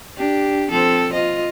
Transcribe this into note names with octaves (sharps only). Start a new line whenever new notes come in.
D4 G4
F3 C4 A4
F4 D#5